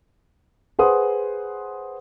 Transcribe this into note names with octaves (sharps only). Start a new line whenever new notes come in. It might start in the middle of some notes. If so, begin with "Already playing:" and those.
G#4 B4 C5 F#5 C6 D#6